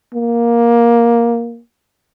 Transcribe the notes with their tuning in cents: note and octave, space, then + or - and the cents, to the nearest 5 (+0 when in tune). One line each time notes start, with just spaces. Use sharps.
A#3 +10